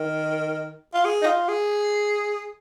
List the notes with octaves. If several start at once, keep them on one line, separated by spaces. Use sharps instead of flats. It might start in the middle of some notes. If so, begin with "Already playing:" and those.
Already playing: D#3
F4
G#4
D#4
F4
G#4